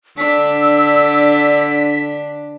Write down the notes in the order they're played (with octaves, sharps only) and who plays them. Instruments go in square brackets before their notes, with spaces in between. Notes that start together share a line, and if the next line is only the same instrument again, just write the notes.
[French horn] D3 [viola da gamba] D4 [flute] E6 [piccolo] B6